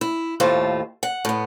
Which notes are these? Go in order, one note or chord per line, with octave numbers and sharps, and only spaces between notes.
E4
D#2 A2 A3 F4 C5
F#5
A2 B3